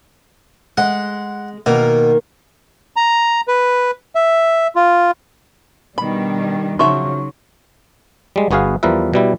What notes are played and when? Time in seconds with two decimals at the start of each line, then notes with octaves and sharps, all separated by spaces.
0.77 G#3 F#5
1.66 B2 D#3 A#3
2.96 A#5
3.48 B4
4.15 E5
4.76 F4
5.98 B2 D#3 G3 D4 B5
6.79 C#3 F3 F#3 D#4 F#4 E5 C6 C#6
8.36 G3 G#3
8.51 G1 B3 F#4 G#4 B4 F5
8.83 E2 F3 G3 A#4 B4 E5
9.14 B2 G3 E4